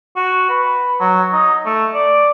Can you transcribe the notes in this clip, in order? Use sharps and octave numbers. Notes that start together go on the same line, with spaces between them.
F#4
B4
F#3
D#4
A3
D5